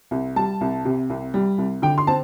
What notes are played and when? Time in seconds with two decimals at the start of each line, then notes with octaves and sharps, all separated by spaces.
0.11 C2
0.36 G3 A5
0.61 C2
0.85 C3
1.10 C2
1.34 G3
1.58 C2
1.82 D3 G5
1.98 C6
2.07 C4 A5